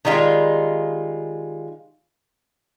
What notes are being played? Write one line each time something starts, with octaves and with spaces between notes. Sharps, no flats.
D#3 G3 G#3 F4